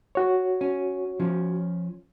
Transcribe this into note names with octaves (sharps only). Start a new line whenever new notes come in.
F#4 C#5
C#4
F3 C#4